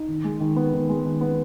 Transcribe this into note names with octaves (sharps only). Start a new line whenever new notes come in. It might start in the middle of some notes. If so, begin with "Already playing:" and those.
Already playing: D#4
D#3
G#3
D#3
B3
D#3
G#3
D#3
B3